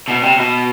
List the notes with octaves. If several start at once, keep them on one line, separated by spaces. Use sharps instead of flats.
B2
C3
B2